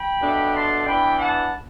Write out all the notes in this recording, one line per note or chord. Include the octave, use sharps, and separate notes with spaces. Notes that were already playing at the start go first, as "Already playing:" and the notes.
Already playing: G5 B5
B2 A3 D4
A5 C6
E3 B3 D4 G5 B5
F#5 A5